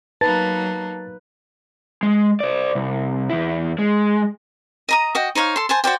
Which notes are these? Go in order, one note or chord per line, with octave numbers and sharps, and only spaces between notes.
F#3 A#3 D#4 B4 A5 A6
G#3
C5 D5
C2
E2 E4
G#3
D#5 A#5 D#6
F#4 D#5 G5
D#4 C5 C#5 F5
A4 C6
C5 G#5 A5
F#4 C5 D5 G5